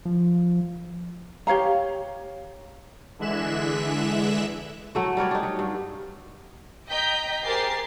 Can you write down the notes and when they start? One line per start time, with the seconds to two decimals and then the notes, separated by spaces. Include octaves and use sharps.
0.05 F3
1.47 G4 C#5 F5 A#5
3.19 D3 E3 G#3 E5 F#6 E7
4.95 F#3 A3 F#4
5.17 G3 A#4 C#5 D5
5.31 D4 D#4
5.43 F#3
5.59 G2
6.90 D#5 G5 A#5 G6 B6
7.45 G4 G#4 A#4 C5 A6 C7